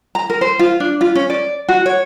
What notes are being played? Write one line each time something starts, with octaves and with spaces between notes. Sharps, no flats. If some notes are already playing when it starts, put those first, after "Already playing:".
A#5
A#4
C5
F4
D4
F4
C#4
D5
F#4
C#5